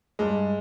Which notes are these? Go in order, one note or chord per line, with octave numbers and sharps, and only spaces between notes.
G2 G#3